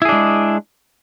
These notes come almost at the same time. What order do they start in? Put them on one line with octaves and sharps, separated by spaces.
E4 G#4 D4 G#3